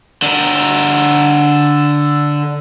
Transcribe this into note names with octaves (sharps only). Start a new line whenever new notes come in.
D3 A#4